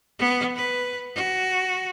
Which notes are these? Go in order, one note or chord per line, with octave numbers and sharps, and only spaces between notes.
B3
B4
F#4